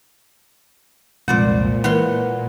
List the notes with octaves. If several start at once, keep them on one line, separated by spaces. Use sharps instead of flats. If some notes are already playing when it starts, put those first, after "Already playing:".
C2 F2 A#2 G#3 C5 D5 F#5
E3 A#3 A#4 F5 F#5 C6